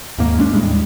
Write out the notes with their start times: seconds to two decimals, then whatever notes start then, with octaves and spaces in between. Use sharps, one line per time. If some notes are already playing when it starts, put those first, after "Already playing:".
0.18 D#2 G#2 A#3
0.39 G#3 C#4 D4
0.53 D#2 A2 G3 G#3